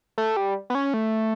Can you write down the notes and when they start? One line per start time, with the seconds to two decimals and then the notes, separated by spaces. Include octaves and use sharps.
0.18 A3
0.37 G3
0.70 B3
0.75 C#4
0.94 A3